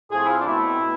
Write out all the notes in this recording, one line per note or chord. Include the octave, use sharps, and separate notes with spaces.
A2 F3 A3 C4 G#4
E4
F4
D4
B2 A3 C4 E4
B2